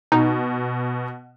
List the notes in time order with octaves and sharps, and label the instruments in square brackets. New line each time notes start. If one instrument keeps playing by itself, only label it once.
[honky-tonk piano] B2 [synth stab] D#4